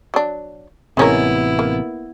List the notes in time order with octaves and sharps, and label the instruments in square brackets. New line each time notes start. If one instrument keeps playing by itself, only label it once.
[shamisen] F#3 D4
[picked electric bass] A1 C3 [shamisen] G#3 C#4 A#4 [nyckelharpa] B3 E4
[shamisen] A#3